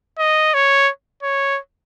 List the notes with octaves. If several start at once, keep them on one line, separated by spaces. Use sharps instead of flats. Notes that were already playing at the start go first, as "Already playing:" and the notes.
D#5
C#5
C#5